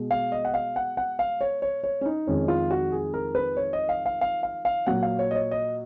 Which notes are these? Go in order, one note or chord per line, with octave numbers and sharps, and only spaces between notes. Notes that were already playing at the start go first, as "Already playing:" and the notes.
Already playing: B2 G#3
F5
D#5
F#5
F5
F#5
F#5
F5
C#5
C#5
C#5
C#4
D#4
F2 D#3 G#3 C#4
F4
F#4
G#4
A#4
B4
C#5
D#5
F5
F5
F5
F5
F5
A#2 F#3 A#3 F#5
F5
C#5
D#5
C#5
D#5